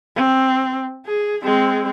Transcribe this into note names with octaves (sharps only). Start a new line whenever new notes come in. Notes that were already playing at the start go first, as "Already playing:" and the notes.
C4
G#4
G#3 C4